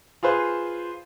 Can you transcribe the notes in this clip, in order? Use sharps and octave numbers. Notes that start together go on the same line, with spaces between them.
F4 G#4 B4 C5